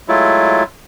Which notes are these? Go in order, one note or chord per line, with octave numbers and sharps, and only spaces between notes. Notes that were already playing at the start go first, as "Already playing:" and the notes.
F#3 G#3 A3 E4 F4